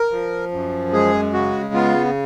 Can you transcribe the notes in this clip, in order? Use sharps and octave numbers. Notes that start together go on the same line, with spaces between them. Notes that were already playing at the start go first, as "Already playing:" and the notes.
Already playing: A#4
F3
F#2
G#3 G#4
C#3 F#4
B3 F4